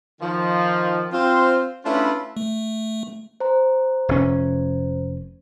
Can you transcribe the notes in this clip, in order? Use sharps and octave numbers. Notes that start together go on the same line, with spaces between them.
D#3 F3
C4 F4 C5
A3 C#4 D4 E4 F4 B4
A3
C5 A#5
F1 C#4